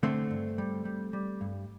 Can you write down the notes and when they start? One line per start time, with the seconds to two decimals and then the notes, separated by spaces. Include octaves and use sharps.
0.03 D3 A3 C4
0.31 G2
0.58 G3
0.85 G3
1.13 G3
1.41 G2